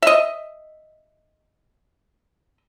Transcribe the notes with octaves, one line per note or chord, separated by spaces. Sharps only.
D#5 E5